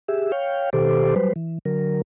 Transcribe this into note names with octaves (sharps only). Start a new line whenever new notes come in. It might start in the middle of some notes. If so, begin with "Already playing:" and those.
G4 G#4 E5
C#5 F5 G5
B2 D#3 G4 A4 C5 D6
F#3 G3 B4 C5
E3
D3 F#3 A#4